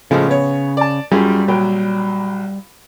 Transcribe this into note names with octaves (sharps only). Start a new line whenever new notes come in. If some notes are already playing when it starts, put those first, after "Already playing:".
A2 C#3 F3 G#3
B3 C#5
D5 A5
F#2 G3 F4 G#4
A#1 F#3 G5